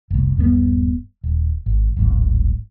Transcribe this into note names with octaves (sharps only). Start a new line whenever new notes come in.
F1 C2
D#1 G2 A#2 B3
D#1
G#1
D1 G#1 G#2 F#3